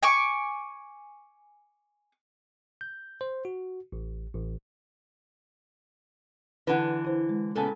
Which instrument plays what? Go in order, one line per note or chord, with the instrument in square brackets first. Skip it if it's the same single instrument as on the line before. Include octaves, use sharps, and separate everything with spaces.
[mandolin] G#5 C#6 D6
[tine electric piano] G6
C5
F#4
A1
A1
[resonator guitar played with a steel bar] D3 E3 [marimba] B4 F#5
[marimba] E4 C5
G#3
[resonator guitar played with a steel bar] A#2 C#3 B3 [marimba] A4 G#5 A5